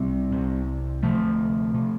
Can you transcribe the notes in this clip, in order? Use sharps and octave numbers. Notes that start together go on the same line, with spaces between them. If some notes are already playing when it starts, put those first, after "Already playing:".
Already playing: C2 C3 G3 C4
C2 C3
D2 C3 F3 A3
C3